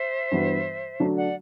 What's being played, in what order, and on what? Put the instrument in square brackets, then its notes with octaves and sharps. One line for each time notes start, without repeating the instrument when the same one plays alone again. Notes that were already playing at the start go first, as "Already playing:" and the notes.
Already playing: [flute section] C5 E5
[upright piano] G2 E3 B3 F#4
D3 F#3 A3 D4
[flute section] D5 F#5